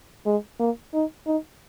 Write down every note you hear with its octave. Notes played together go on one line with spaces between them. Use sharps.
G#3
A#3
D#4
D#4